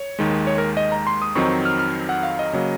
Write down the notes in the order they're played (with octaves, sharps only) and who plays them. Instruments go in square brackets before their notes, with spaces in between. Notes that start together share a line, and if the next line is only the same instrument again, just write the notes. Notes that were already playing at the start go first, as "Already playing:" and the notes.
Already playing: [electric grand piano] C#5
D#2 D#3 G#3
C#5
A#4
D#5
A#5
C6
D#6
F2 D#3 F#3 C4 D#4 C#6
F6
F6
F#5
F5
D#5
C#3 F#3 A#3